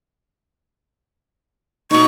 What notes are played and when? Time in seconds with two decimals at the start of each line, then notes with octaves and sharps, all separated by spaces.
1.91 B2 D#4 C#6